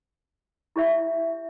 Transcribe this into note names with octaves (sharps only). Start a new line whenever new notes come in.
E4 G4 C#5 E5